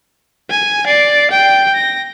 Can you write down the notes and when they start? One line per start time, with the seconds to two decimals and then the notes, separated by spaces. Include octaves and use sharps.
0.50 G#5
0.87 D5 C7
1.31 G5
1.75 A#6